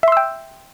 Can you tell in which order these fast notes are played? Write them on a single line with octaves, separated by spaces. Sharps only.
E5 C6 E6 G5